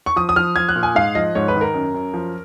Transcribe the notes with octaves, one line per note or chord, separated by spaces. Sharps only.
C#6
F3 D#6
D#6
F3 F6
F3 G#6
F#6
A#2
G#5
G#2 F5
F3 D#5
G#2 C#5
B4
D#3
A#4
F#2
F#2
F3